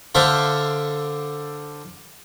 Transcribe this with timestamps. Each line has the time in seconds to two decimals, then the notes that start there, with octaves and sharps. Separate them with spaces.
0.15 D3 D4 C5 E5 F5